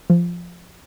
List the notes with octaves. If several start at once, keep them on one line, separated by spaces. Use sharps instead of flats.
F3